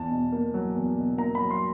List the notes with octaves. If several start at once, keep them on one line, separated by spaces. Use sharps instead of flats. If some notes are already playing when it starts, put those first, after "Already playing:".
Already playing: E2 A5
B2
A#3
F#3
E2
B2
A#3 A#5
B5
F#3
C6